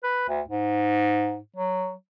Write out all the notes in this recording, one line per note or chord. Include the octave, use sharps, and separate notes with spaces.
B4
D2
G#2
F#3